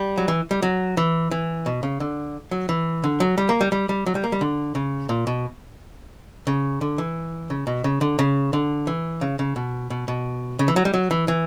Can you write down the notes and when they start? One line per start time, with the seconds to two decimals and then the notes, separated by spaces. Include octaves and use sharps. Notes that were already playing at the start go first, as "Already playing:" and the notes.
Already playing: G3
0.18 F#3
0.28 E3
0.51 G3
0.62 F#3
0.97 E3
1.31 E3
1.66 B2
1.83 C#3
2.00 D3
2.51 F#3
2.69 E3
3.04 D3
3.20 F#3
3.38 G3
3.49 A#3
3.61 G3
3.72 G3
3.89 G3
4.06 F#3
4.15 G3
4.24 A#3
4.32 G3
4.41 D3
4.75 C#3
5.09 A#2
5.27 B2
6.47 C#3
6.81 D3
6.98 E3
7.50 C#3
7.67 B2
7.84 C#3
8.01 D3
8.19 C#3
8.53 D3
8.87 E3
9.21 C#3
9.39 C#3
9.56 B2
9.90 B2
10.08 B2
10.59 C#3
10.68 E3
10.76 F#3
10.85 G3
10.94 F#3
11.11 E3
11.28 E3